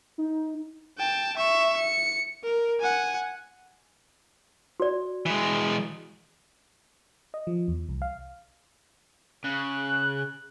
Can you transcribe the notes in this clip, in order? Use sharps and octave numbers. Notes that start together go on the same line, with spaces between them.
D#4
G5 A5
E5 C#6
C#7
A#4
F#5 G#5
F#4 D5
E3 G#3
D#5
F3
E2
C2
F5
C#3 F#6